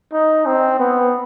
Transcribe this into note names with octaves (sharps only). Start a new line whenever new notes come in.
D#4
C4
B3